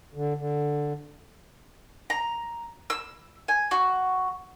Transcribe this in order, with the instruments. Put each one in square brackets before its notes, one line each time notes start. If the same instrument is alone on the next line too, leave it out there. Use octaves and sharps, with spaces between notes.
[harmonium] D3
D3
[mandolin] A#5
E6
G#5
F#4